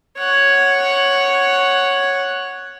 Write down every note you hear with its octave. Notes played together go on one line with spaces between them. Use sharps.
C#5 F#5